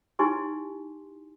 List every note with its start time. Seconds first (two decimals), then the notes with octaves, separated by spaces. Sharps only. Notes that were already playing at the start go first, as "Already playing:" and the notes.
0.19 D#4 E4 G4 G#5 C6